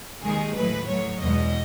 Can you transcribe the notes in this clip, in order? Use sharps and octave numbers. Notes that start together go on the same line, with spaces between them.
D#2 D#3 G#3 G#4
A2 F#3 B4
A2 F#3 C#5
E2 B2 G#3 D#5